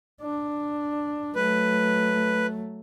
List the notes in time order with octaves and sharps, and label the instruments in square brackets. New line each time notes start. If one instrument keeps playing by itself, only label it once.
[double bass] D4
[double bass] F#3 A3 [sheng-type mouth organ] B4